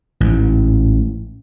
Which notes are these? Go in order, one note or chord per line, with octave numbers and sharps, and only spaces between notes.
A1 G#2